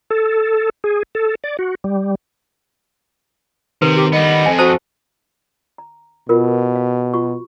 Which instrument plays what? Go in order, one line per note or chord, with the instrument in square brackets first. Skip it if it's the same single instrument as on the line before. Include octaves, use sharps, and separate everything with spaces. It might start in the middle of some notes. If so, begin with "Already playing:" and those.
[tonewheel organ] A4
G#4
A4
D5
F#4
G3
[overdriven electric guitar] C3 [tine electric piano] D#3 [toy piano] B4
[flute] G4
[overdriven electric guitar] G3 B3 [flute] D#5
[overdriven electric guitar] F2 [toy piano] G#5
[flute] F#4 [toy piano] C5 A5 [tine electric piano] D#6
[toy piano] A#5
[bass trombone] B2 [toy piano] F4 A#4
[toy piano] F5
F4 F#4 C#6